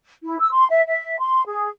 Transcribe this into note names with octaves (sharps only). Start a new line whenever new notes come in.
E4
E6
C6
E5
E5
C6
G#4